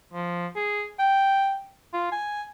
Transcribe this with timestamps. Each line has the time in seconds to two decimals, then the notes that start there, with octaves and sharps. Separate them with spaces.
0.13 F3
0.56 G#4
0.99 G5
1.93 F4
2.12 G#5